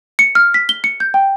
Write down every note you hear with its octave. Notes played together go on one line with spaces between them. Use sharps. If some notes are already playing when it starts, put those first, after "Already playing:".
C#7
F6
B6
G7
C#7
G6
G5